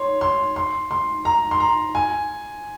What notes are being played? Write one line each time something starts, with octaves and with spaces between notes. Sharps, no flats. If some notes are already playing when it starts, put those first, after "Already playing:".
Already playing: C#5 C6
C6
C6
C6
A#5
C6
A#5
G#5